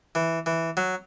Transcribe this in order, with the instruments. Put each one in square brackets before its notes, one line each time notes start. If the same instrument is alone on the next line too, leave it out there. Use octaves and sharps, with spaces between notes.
[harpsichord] E3
E3
F#3